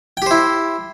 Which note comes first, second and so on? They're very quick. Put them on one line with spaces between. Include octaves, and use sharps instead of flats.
G5 G4 C5 E4